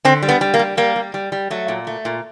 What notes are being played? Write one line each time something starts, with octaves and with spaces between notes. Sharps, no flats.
D3 C4
G3
B3
G3
A#3
G3
G3 A#3
G3
G3
G3
F#3 A3
A#2
A3
A#2